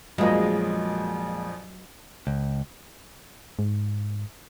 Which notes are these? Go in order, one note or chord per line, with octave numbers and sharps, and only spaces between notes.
A#1 F2 F3 F#3 G#3 A#3 D#5
C#2
G#2